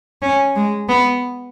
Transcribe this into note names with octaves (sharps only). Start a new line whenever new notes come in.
C#4
G#3
B3